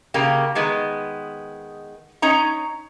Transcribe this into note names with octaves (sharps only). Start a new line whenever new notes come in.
C#3 A#3 G4
D#3 G#3 B3
C#4 D#4 A#5